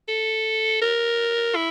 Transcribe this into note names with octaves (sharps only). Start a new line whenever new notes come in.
A4
A#4
E4